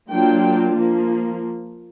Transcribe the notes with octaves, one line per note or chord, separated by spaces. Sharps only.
F#3 A#3 D4 F4 G5
F3 A#3